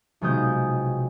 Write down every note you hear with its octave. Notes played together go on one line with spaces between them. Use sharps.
B1 C3 F3 G#3 D#6 G6